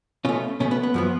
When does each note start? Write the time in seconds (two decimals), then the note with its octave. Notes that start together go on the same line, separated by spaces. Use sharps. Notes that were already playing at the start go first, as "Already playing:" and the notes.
0.25 B2 A3 C#4 F4
0.60 B2 A3 C#4
0.71 B3
0.83 B3
0.94 F#2 F3 B3